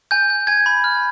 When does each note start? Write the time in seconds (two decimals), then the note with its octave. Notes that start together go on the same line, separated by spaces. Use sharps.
0.11 G#5 G6
0.30 G6
0.47 G#5 G#6
0.66 B5
0.84 F6